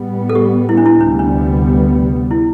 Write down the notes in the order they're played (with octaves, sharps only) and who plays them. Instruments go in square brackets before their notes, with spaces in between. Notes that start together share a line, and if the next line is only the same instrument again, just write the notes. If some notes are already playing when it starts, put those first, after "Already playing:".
Already playing: [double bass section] A2 G3 B3
[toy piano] A4
G4
E4
D4
E4
[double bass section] D2 C3 G3 B3 [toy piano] D4
[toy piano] D4
E4